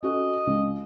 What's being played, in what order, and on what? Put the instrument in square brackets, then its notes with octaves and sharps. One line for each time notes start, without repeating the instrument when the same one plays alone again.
[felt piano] C#4 F#4 A4 [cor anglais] D#5
[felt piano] C#2